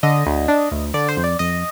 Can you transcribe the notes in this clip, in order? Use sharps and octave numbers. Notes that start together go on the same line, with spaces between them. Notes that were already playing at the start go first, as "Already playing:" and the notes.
D3 D#5
D2
D4
D2
D3 D5
C5
F2
D5
F2 D#5